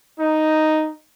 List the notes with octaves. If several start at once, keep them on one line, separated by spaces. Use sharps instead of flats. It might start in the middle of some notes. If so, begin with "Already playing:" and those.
D#4